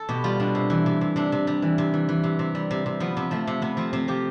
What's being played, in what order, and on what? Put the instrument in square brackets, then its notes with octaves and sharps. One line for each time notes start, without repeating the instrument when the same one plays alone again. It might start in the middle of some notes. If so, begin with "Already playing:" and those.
Already playing: [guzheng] A4
B2 G4
G3 F4
B2 D4
C3
E3
C3
C3
C3 D4
C3
G3
E3
C3
E3
E3
C3
C3
G3
C3
C3
F3 B3
C3
F3 A3
C3
C3 B3
F3 C4
C3 C4
F3 G4